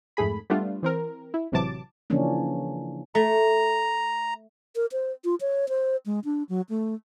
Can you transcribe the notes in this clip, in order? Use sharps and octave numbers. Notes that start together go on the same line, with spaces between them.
F2 G#2 A3 G#4 B5
G3 A3 B3 D4 F4
E3 C4 A#4
E4
A1 C3 E3 F#3 A5 D6
C#3 E3 F3 A#3 C#4 D4
A3 A#5
A#4
C5
F4
C#5
C5
G#3
D4
F#3
A3